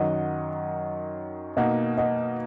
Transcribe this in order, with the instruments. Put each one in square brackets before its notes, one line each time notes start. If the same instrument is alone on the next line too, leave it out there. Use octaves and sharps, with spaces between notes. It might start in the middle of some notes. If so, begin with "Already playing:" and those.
Already playing: [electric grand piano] F#2 D#3 F#3 [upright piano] D#5 F#5
[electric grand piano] B2 A#3 D#4 [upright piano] D#5 F#5
[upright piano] D#5 F#5